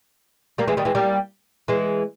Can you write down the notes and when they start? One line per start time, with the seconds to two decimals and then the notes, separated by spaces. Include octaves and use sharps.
0.58 G3 A#3
0.68 E3 G#3
0.77 D#3 G3
0.85 E3 G#3
0.95 G3 A#3
1.68 E3 G#3